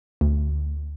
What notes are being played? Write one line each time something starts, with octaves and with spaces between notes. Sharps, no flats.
D2